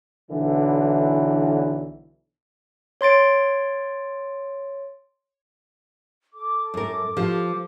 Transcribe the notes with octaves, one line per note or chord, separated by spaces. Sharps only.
B1 D3 E3
C#5 C6 A6 D7
A4 D6
F#2 A#4
F3 F4 G4 B4